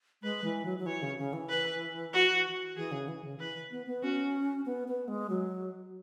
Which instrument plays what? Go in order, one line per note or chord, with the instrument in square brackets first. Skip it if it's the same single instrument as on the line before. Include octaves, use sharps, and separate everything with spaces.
[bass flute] G#3 [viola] B4
[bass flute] E3
F#3
F#3
[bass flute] E3 [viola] C#5
[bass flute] C#3
C#3
E3
[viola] B4
F#4
[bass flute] E3 [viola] G#4
[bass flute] C#3
E3
C#3
[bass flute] E3 [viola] B4
[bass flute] B3
B3
[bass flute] C#4 [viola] F#4
[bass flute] B3
B3
G#3
F#3